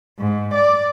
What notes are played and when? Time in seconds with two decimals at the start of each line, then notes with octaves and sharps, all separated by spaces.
0.19 G#2
0.54 D5